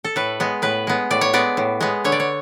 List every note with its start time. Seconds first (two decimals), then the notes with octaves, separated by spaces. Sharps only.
0.04 A4
0.16 A2 B4
0.40 G#3 B3
0.62 A2 B4
0.87 G#3 B3
1.11 A2 D5
1.21 C#5
1.33 G#3 B3 D5
1.57 A2
1.81 G#3 B3
2.04 D3 C#5
2.12 D5
2.20 C#5